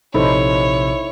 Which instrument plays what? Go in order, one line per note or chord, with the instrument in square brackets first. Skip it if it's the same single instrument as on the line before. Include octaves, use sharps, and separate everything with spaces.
[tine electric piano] A#1 C3 [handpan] D#4 A4 C5 [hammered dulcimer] E4 [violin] C#5